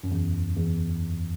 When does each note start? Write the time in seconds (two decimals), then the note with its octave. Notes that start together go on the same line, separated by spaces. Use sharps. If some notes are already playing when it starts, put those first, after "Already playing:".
0.03 F#2
0.11 E2
0.56 E2